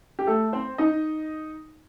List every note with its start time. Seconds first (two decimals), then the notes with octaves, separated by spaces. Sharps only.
0.19 G4
0.27 A3 A4
0.53 C4 C5
0.78 D#4 D#5